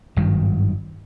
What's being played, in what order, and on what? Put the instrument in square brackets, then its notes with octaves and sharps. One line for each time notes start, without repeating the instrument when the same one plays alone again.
[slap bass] G#1 G2 D#3 F#3